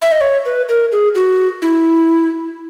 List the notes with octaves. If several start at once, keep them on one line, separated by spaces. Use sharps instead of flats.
E5
D#5
C#5
B4
A#4
G#4
F#4
E4